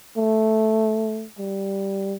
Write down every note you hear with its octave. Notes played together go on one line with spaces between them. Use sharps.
A3
G3